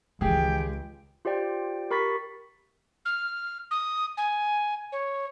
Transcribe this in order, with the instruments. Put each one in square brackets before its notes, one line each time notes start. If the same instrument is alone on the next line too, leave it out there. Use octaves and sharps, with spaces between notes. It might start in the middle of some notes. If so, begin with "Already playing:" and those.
[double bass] C#2 [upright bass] D#3 E3 [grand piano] G4 G#4 [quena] G5
[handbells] F4 G4 C5 D5 G5
G4 A#4 B5 C#6 A6 B6
[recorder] F6
D#6
G#5
C#5